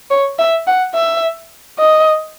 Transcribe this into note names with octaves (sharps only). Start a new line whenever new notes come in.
C#5
E5
F#5
E5
D#5